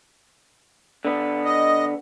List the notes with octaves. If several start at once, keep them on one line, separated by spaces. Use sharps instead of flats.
D3 B3
D#5